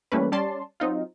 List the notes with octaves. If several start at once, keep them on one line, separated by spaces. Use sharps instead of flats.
E3 G3 A3 A#3 C#4 B4
G3 C#4 D5 A5 C6
F#3 C4 D#4 F4